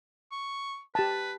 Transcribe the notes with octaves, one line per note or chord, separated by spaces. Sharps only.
C#6
G4 B4 A5